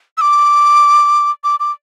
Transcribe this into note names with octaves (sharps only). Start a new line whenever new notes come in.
E6
D6
D6
D6